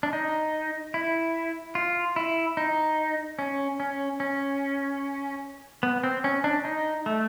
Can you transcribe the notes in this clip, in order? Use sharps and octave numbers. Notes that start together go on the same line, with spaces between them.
D4
D#4
E4
F4
E4
D#4
C#4
C#4
C#4
B3
C4
C#4
D4
D#4
A3